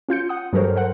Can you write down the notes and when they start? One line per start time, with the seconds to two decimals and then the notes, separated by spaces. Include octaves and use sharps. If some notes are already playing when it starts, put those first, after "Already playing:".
0.09 C#4 F4 G6 C#7
0.29 F#5 D#6
0.53 G2 F#3 A4 A#4 C5 C#5
0.76 A#4 C5 F#5